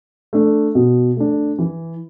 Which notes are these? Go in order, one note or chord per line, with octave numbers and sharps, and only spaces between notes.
A3 D4
B2
A3 D4
E3